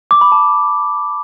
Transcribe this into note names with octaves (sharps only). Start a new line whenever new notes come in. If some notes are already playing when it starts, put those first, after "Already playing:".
D6
B5
A5